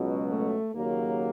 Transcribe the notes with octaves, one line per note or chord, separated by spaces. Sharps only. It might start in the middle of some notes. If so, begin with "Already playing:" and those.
Already playing: C#2 B2 F#3
A3
D#2 C#3 F#3 A#3